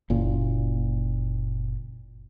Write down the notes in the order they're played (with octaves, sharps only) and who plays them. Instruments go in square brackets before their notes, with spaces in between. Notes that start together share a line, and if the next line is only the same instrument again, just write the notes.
[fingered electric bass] F#1 A#2